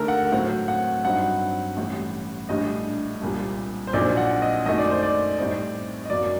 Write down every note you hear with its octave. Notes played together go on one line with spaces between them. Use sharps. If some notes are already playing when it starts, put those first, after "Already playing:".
Already playing: D#2 D3 A3 D4 A4 A#4
F#5
A2 F#3 C4 F#5
F#5
G2 F#3 C4 D#4 F#5
A1 A2 G3
A#1 A2 G3 D4 D#5
C2 A#2 G3
C5
A#1 A#2 F#3 C4 D#4 D5
F#5
D#5
F#2 D#3 A3 D#5
D5
C5
D5
A2 G3 C4 D#4
D#5
F#2 F#3 A#3 D5